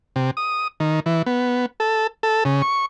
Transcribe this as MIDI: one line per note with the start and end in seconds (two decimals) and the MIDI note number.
0.16 0.31 48
0.37 0.68 87
0.80 1.00 51
1.06 1.22 52
1.26 1.66 59
1.80 2.07 69
2.23 2.44 69
2.45 2.62 49
2.62 2.86 85